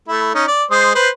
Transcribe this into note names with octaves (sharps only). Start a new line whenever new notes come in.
A3 E4
C#4 D#4
D5
G#3 C5 D#6
B4 C5